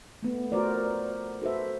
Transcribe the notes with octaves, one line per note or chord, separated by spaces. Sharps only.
A3 B3
A3 F4 F#4 A#4 C5 D5
F#4 A4 B4 C5 E5